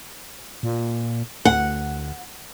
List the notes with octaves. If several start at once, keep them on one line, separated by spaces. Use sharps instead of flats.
A#2
D2 F#5